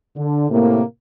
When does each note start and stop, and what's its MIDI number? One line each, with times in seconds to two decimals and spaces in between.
0.16 0.50 50
0.50 0.81 45
0.50 0.81 48
0.50 0.81 58